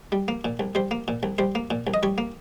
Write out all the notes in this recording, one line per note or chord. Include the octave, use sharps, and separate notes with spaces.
G3
A#3
A#2
C2
G3 C5
A#3
A#2
C2
G3 C5
A#3
A#2
C2
D#5
G3 C#5
A#3